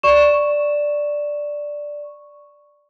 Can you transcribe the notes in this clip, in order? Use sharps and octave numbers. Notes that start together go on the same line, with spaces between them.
D5 C#6 E7